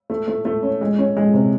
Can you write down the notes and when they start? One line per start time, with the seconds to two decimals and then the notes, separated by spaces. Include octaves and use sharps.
0.10 A3
0.28 A3
0.45 A3
0.63 C#4
0.81 G#3
0.98 C#4
1.17 G#3
1.34 C3